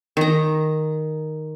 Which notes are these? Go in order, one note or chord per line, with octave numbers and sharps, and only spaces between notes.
D#3 A#5